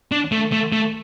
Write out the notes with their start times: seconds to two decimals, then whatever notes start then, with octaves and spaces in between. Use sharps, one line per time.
0.12 D4
0.32 A3
0.52 A3
0.72 A3